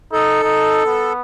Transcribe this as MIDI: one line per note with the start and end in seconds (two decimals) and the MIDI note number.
0.13 0.40 63
0.13 1.13 69
0.43 0.83 63
0.86 1.22 59